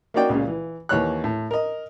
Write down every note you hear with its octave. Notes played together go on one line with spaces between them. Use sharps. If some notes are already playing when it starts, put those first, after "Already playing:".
A#3 C#4 D#4 F#4 D5 G5
C#2 A#2 C#3
E3
D#2 E3 C#5 F#6
A2
A#4 D#5